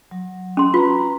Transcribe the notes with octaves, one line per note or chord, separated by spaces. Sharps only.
F#3
C#4 C6
F4 B4 A#5